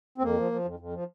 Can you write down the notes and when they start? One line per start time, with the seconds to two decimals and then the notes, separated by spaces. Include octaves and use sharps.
0.18 C4
0.22 F2 A#3
0.37 F3
0.52 F3
0.65 F2
0.79 F2
0.94 F3